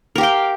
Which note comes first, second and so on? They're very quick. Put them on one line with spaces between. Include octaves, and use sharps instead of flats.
A#4 G4 F5 G5